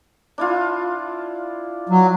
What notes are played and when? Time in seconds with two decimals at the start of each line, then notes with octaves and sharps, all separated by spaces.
0.38 D4 E4 F4
1.89 F#3